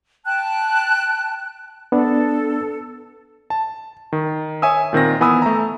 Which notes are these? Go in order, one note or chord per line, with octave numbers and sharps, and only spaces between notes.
G5 A5 F#6
B3 D4 A4
A5
D#3
C#5 E5 G#5 D#6 E6
A#2 D#3 C4 A#6
E3 B3 G#5 B5 D#6 E6
A3 A#5